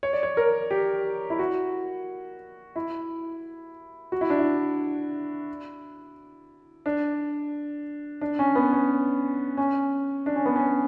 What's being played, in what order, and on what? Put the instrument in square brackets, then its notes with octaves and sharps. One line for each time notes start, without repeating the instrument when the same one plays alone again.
[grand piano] C#5
D5
C#5
A#4
G4
E4
F#4
E4
F#4
E4
D4
E4
D4
D4
C#4
B3
C#4
C#4
D4
C#4
B3
C#4